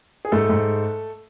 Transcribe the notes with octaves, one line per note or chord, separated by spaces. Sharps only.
G#4
G#2 A3 A4
G#2